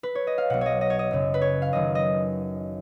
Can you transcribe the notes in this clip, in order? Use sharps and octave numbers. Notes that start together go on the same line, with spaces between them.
B4
C#5
D#5
F5
B1 B2 F#5
C#5 D#5
D#5
C#5
D#5
F#1 F#2 C#3
B4
C#5
F5
F#1 F#2 D#3 D#5
D#5